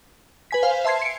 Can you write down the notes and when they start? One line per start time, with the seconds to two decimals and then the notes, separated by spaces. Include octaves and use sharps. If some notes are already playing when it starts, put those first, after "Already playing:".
0.51 B4 G#5 B6
0.62 B4 C5 F5 G#5
0.84 E5 A5 C6 G#6 C7
1.02 C#7 D7